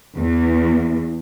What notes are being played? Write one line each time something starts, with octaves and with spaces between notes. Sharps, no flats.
E2